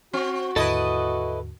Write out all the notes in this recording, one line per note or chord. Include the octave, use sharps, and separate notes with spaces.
C4 F#4
D#2 G#2 D3 E4 A4 B4 D#5